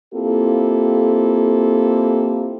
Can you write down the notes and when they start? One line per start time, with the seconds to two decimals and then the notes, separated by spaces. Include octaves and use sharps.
0.13 A#3 C4 E4 F4 G4 A4